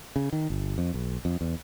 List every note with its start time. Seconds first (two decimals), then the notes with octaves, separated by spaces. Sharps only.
0.16 C#3
0.33 D#3
0.50 G1
0.78 F2
0.94 B1
1.25 F2
1.41 E2